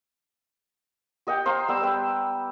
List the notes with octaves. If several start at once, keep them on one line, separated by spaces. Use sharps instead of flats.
G4 D#5 F#5 G5
C5 F5 A#5 C6
G3 B3 E6
B4 G5 E6